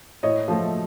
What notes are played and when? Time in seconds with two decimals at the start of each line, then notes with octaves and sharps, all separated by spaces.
0.23 A2 C#5 D#5
0.48 F3 A3